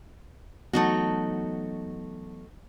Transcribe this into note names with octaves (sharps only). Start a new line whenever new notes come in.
E3 F#3 A3 B3 D#4 F#4